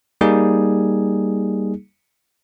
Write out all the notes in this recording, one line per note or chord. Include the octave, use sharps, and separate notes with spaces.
G3 A#3 D#4 G#4